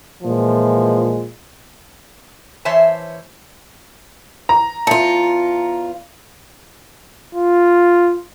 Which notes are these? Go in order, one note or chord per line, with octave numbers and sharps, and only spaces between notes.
A#2 E3 F3 G#3
E3 C5 C#5 E5 A5
A#5
E2 F4 A5 C#7
F4